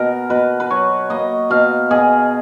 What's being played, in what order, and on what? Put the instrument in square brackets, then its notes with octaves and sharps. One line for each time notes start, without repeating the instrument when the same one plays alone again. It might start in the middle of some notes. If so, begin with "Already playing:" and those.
Already playing: [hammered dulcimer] B2 A#4
B2 B4
B4
F#3 C#5
A#3 D#5
B2 F5
B2 G#4